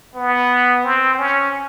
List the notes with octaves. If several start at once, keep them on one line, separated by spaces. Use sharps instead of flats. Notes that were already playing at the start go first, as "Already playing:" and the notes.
B3
C4
C#4